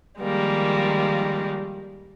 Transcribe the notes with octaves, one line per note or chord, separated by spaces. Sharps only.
D#3 F3 G3 G#3 A#3